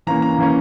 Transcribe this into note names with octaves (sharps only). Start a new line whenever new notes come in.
E3 A#3 C#4 A#5
A#5
E3 A#3 C#4